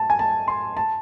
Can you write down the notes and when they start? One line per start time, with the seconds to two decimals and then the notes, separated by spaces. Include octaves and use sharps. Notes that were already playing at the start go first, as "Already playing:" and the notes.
Already playing: A5
0.10 G#5
0.19 A5
0.48 C6
0.77 A5